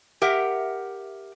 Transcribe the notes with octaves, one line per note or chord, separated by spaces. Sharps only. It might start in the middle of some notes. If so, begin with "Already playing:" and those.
G4 A#4 E5 F#5